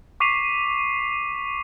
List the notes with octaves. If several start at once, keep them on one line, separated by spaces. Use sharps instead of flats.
C#6 D6 B6 C7 D#7 F7